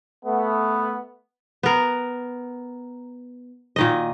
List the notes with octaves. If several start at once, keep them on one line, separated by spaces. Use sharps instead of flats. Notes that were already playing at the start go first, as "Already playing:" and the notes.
A3 B3
B3 A#4
A#2 D#3 D#5